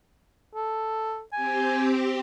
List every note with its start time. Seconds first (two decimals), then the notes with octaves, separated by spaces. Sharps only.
0.55 A4
1.33 C4 G4 G#5